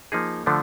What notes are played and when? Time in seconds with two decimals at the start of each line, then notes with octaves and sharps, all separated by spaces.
0.12 F3 A#3 D#4 G#4
0.46 D3 F3 A3 D4